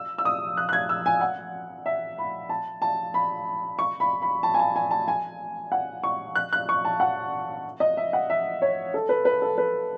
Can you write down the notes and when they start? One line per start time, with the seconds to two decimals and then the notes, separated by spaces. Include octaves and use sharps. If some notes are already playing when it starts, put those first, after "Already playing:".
Already playing: E6
0.18 E6
0.25 D#6
0.57 F#6
0.69 F#6
0.73 G#6
0.89 E6
1.06 G#5
1.21 F#5
1.86 E5
2.18 B5
2.49 A5
2.82 A5
3.14 B5
3.79 C#6
4.00 B5
4.22 B5
4.43 A5
4.54 G#5
4.59 A5
4.76 G#5
4.91 A5
5.08 G#5
5.72 F#5
6.03 C#6
6.35 F#6
6.53 F#6
6.69 C#6
6.85 A5
7.00 F#5
7.80 D#5
7.97 E5
8.13 F#5
8.30 E5
8.62 C#5
8.94 A4
9.09 B4
9.25 B4
9.42 A4
9.58 B4